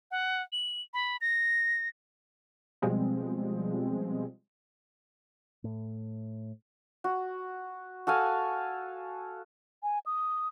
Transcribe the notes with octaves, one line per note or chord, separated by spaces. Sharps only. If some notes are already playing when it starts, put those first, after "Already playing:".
F#5
F#7
B5
A#6
B2 F3 G3 G#3 C4
A2
F#4
F#4 A4 F5 G#5
G#5
D#6